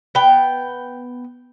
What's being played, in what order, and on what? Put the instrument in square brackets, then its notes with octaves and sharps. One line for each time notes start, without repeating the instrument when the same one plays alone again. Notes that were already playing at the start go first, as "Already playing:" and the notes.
[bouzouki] B3 G5